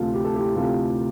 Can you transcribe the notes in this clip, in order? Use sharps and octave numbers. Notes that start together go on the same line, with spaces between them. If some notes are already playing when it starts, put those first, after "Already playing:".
Already playing: D2 C3 F3 F4 A4
G4
A4
E4 G4
D2 C3 F3 F4 A4